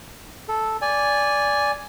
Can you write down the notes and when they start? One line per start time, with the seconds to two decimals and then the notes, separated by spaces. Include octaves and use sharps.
0.48 A4
0.82 D5 G#5